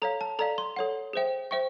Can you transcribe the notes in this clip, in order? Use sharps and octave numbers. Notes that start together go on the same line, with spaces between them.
A4 C#5 F5 A#5
A5
A4 D5 F5 A#5
C6
A4 C#5 F#5
G#4 C5 E5 G5
C5 E5 G5 C#6